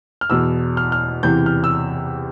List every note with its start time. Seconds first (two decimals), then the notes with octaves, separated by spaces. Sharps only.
0.21 F6
0.30 E2 B2 E6
0.77 F6
0.92 F6
1.23 E2 C3 E3 G6
1.46 F6
1.64 E6